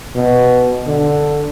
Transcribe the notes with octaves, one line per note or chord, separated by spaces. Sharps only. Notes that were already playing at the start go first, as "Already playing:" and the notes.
B2
D3